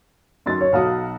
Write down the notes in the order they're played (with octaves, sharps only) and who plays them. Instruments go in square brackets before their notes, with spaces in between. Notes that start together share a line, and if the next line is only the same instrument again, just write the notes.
[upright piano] F#2 [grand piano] D#4 C6 A6
[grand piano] C#5
[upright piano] B1 F#4 [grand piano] F5 A5 D#6